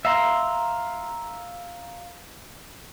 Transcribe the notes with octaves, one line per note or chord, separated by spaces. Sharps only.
E5 F5 A#5 C6